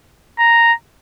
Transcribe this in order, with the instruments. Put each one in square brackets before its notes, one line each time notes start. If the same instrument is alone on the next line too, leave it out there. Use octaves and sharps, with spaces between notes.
[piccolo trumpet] A#5